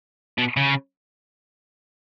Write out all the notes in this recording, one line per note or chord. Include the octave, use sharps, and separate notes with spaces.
B2
C#3